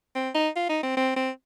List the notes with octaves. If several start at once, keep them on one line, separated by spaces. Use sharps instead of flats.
C4
D#4
F4
D#4
C4
C4
C4